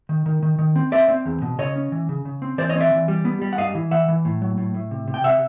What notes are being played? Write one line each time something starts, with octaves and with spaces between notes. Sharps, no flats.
D#3
D#3
D#3
D#3
C4
C4 D5 E5
C4
E2
B2
C#3 C#5 D#5
C#4
E3
C#3
C#3
C4
E3 C5 D5
C#5 D#5
C4
D5 E5
E3
G3
B3
G3
F#5
G2 D#5 F5
E3
E3 E5 F#5
E3
A2
F#3
A2
A2
C3
C3
G5
C3 E5 F#5